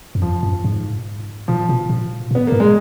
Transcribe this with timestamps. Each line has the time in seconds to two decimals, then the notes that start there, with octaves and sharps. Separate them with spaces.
0.15 F#2
0.21 F2 F3
0.43 F#2
0.65 G#2
1.48 A#2 F3
1.69 B2
1.90 A#2
2.31 A#2
2.35 B3
2.47 A#3
2.52 G#2
2.60 G#3